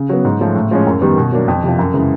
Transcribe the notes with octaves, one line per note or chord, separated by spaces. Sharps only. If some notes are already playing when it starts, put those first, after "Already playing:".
Already playing: C#3
F#3 B3
G#2
F3 A3 C#4
A2
F3 G#3 C#4
F#2
D#3 G3 B3
B2
F#3 A#3 D4
F2
C3 F3
F#2
C#3 E3 G#3